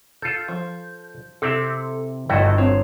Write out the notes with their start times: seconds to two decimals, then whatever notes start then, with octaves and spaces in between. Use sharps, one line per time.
0.22 F4 A4 G6
0.48 F3
1.42 C3 C4 E4 A4
2.29 G1 A3 E4 F#4 D#5 G5 E7
2.58 C4 C#5